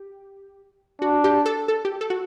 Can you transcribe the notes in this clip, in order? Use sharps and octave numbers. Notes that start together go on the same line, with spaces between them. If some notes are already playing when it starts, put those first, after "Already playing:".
Already playing: G4
D4 F#4
G4
A4
A4
G4
A4
F#4